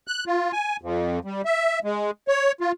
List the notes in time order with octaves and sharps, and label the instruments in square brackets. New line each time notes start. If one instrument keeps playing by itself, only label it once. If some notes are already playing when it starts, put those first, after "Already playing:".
[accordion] F#6
F4
G#5
F2
G3
E5
G#3
C#5
F4